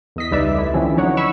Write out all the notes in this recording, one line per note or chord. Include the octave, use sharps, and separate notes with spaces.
E2 D#5 B6
C#2 G3 D#4 B4 D5 E5
A3 E4
D3 E3 F3 C4 C#4
F#3 D#4 C#5 F#5
B5 C#6 E6